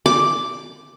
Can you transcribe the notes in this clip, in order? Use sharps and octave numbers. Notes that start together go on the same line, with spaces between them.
D6